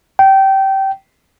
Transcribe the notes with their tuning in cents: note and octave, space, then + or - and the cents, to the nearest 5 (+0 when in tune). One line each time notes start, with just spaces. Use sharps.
G5 -20